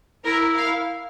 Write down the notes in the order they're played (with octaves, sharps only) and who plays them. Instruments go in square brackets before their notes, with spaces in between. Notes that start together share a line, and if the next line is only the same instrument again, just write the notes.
[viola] E4 [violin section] A#4
[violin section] F5